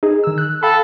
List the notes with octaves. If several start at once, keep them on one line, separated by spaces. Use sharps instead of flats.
D#4 G#4
D#3 E6
F#6
A4 F5 G5 B5